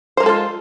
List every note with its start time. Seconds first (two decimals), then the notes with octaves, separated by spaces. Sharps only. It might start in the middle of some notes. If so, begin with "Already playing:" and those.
0.17 C5
0.20 A#4
0.23 G#3
0.26 A4
0.29 F4